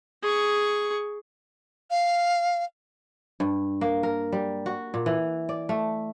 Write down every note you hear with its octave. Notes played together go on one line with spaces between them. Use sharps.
G#4 C#6
F5
G2
A#3
A#4
G3
F#4
A#2
E3
D5
A3